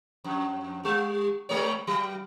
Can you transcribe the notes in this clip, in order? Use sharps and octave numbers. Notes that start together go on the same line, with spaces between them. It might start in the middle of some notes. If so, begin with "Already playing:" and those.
F2
G3
G3 G#3 C#5
F#3